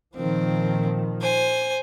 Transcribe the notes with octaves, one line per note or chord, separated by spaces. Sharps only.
A#2 D#3 F3 C4
C5 G#5